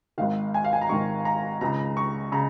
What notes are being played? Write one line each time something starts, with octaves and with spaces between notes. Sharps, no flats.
G#1 G#2 D#3 F5
G#5
F5
G#5
A#5
G#1 G#2 D#3 C#6
A#5
C#2 C#3 A#5
C#6
C#3 A#5